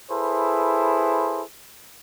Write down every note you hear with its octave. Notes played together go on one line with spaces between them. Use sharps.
E4 G#4 A4 B4 C5